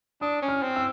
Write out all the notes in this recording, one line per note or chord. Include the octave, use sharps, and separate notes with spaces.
D4 D#6
C#4
F6
C4
E6